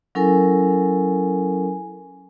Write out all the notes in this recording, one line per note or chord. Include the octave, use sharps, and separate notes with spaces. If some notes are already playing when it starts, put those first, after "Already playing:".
F#3 C#4 E4 A4 A#4 G#5